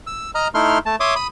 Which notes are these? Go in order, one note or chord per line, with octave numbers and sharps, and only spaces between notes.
E6
D#5 A#5 F6
A3 D#4 E4 C6 F6
A3 A5
C#5 E5 C6 D6 D#6
B5 D#6